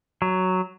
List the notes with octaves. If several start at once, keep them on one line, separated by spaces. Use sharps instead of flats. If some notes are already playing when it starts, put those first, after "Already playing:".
F#3